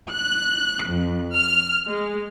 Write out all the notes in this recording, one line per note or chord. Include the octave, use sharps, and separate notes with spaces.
F#6
F2
F6
G#3